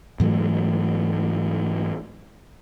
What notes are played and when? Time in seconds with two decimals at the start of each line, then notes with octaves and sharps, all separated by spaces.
0.20 G#2 E3 F#3 A3